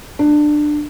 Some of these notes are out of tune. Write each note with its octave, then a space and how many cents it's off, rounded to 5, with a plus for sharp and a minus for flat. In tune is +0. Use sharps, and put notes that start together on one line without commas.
D4 +20